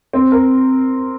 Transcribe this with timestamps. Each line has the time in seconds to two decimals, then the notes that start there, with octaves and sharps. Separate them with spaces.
0.13 C4
0.32 A#4